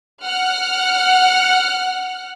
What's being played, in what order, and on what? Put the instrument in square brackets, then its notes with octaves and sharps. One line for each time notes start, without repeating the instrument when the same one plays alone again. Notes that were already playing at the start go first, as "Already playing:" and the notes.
[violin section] F#5 F6 F#6